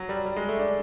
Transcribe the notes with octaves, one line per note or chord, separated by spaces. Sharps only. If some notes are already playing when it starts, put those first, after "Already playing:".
Already playing: F#3
G3
G3
G#3
A3
D4